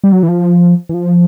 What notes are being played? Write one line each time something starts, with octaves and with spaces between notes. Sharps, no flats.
G3
F#3
E3
F3
E3
F3